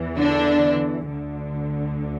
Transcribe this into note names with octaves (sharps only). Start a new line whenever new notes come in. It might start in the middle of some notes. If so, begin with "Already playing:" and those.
Already playing: E2 E3
D3 D4
D2 D3